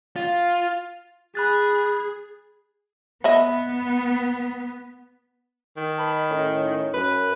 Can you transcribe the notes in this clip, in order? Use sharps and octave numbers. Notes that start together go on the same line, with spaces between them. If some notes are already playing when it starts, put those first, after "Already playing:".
F4
G#4 B5 F#6 A6
B3 D#5 E5 B5
D#3
D#5 A5 B5
A2 C#4 D#4
F#2 B4